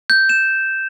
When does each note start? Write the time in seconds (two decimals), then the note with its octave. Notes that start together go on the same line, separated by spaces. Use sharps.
0.10 G6
0.29 E7